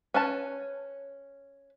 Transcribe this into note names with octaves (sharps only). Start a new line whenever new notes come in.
C#4 B4 A5